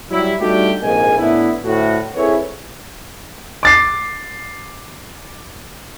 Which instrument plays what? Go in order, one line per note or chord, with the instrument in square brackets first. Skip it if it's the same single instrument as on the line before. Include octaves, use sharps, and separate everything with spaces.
[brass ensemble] F#3 G3 E4
G3 A3 D4 D#4 F#4 G4
A#1 F2 G#2 A#3 D#5 G#5
A2 B3 D4 E4
D2 A2 F#4
C4 E4 G#4 A4 B4 C#5
[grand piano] D6 A6 C7